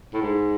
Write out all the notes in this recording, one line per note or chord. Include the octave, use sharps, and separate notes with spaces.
A2
G#2